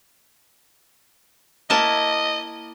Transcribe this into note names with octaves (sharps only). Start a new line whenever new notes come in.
A#3 E4 D#5 A5